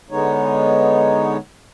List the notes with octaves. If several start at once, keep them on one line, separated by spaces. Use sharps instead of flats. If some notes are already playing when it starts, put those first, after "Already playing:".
D3 G#3 B3 D#4 C#5